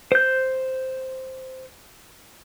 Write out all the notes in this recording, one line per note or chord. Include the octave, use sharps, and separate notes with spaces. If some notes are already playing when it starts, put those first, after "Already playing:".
C5 G6